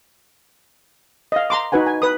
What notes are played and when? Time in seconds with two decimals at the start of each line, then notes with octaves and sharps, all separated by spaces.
1.32 D#5 F5
1.50 A#5 C6 D6
1.72 D#4 F#4 B4 F#5 G#5
1.86 G#5
2.02 B4 D#6